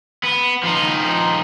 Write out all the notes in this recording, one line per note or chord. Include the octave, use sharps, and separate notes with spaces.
B3
F3 D#4